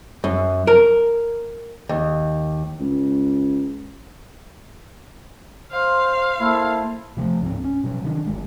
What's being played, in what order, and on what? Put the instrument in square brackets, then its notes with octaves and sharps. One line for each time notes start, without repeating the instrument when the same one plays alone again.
[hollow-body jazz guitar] F#2
A#4
D#2
[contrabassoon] C#2
[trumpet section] C5 [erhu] F5
[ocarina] A#3 [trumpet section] E4 A4 C5
[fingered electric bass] C3 F3 G#3 A3
C#2 G#2 F3 C4
C#4
B2 F#3
C3 D#3 D4
G1 G#3